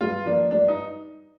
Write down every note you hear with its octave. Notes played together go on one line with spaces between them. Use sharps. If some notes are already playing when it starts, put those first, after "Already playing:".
G2 F4
F3 A#3 D4
G2 D4
D#4